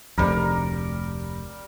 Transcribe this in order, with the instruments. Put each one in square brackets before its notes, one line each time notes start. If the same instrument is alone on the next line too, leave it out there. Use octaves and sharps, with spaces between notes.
[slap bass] F1 D2 [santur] G3 A#4